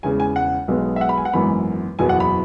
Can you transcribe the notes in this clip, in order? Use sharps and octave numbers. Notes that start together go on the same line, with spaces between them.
E1 E2 C#3 G#5
G#5
F#5
B1 B2 G#3 B3
E5
F#5
B5
G#5
F#5
G#1 F#2 E3 B3 B5
F#1 E2 B2 F#3 G#5
F#5
B5